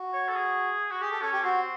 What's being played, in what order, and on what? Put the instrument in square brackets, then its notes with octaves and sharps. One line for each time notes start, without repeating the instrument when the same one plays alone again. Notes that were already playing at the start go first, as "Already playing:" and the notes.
Already playing: [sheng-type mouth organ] F#4
[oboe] C#5
A4
G#4
F#4
[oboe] G4 [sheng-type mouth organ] G#4
[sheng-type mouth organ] A4
[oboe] C#4 [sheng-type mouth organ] A4
[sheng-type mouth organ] G4
[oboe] C4 [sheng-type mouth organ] F#4